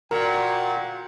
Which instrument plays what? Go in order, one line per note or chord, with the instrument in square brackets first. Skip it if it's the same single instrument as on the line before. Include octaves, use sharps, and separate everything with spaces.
[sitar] A#2 [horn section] F#4 G5 [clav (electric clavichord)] A#4